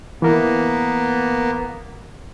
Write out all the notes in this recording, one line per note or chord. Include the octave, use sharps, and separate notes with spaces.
E3 A#3 B3 A#4